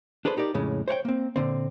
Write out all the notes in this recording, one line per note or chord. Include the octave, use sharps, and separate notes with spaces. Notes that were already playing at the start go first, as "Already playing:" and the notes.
D4 G#4 A4 B4 C5
D#4 G4 A#4 D5
F2 A2 C#3 G#3
C5 C#5 F#5 G5
A#3 C4
A#2 D3 C4